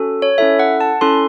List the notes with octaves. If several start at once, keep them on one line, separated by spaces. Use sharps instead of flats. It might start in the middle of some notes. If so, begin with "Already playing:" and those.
Already playing: C#4 F#4 A4
C#5
C#4 E4 A4 E5
F#5
A5
C#4 E4 A4 C6